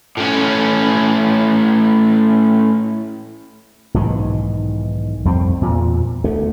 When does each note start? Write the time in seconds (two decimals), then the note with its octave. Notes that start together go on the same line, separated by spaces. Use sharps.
0.17 A2 C#4
3.94 B1 G#2 D#3 E3
5.25 F2 G3 C4
5.62 E2 A#2
6.24 D2 A3